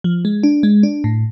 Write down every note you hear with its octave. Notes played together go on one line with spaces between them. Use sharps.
F3
G#3
D4
G#3
D4
A2